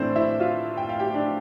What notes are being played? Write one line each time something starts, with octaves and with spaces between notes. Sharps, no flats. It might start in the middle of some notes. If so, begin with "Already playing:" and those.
Already playing: A2 E3 A3 C4 D4 C5
E4 E5
F4 F5
G5
F5
G4 G5
D4 D5